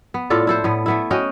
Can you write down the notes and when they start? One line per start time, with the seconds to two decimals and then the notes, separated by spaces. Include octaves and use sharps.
0.14 B3
0.30 A2 F4 A4 D5
0.47 E4 A4 C5
0.64 A2 B3
0.86 A3 B3 E4
1.11 C#4 F#4 D#5 G5